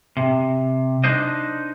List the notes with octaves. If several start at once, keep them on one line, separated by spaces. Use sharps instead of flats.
C3
D4 D#4 C5 D#5